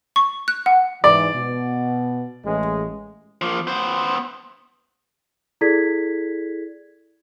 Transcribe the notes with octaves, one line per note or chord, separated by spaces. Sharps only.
C#6
F#6
F#5
G#2 E3 D5
B2
A1 G#3
F3 A#3
B3 C5
E4 G#4 A4 D5 G#6 B6